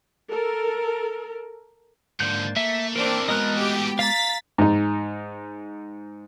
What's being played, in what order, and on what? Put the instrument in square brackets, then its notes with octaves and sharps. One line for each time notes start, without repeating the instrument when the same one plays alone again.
[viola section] A4 A#4
[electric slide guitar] G#2 A#3 D4 [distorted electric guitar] D3 F3 [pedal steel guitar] G6
[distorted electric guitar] A3 [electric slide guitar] A#3 [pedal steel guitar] E5
[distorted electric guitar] E3 A3 [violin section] C4 D4 [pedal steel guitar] A#4
[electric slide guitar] G#3 B3 F#4 [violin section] A#4 [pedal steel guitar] D#5 F6 F#6
[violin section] G4
[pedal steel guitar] F5 A#5 [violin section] A6 B6
[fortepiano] G#2 D#4